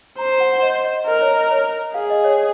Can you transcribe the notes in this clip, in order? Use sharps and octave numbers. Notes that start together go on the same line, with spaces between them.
C5 A#5
F#5
D#5
D#5
A#4 D#5
C#5
D#5
C#5
G#4 F5
D#5
C#5
C#5